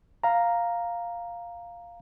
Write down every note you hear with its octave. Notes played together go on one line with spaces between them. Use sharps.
F5 A#5